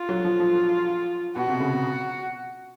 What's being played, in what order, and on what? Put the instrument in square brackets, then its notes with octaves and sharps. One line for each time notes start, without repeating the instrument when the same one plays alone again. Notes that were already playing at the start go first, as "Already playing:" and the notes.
Already playing: [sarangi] F4
[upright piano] F#3
F3
F3
[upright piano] B2 [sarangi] F#4
[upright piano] C3
C#3
B2